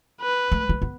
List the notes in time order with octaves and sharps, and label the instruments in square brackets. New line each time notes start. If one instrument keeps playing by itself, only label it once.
[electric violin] B4
[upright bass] A3
A3
B3